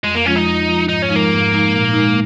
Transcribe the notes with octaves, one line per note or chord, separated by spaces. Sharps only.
F2 G#3
A#3
F3 G#3 C#4 F4
D#4
F2
F3 G#3 F4
G#2 D#4
C#4
F3 G#3 D#4
A#3
G#2
F3 G#3 D#4
A#2
D#4
G#3